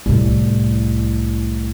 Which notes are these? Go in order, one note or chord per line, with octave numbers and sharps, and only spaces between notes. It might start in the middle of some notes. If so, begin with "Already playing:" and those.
C2 A2